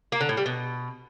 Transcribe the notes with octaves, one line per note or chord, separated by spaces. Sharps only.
A#3
D3
A2
G3
B2